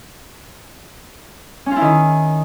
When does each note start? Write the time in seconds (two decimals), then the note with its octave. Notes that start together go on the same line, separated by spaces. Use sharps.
1.66 C#4
1.71 F4
1.76 E4
1.81 D#3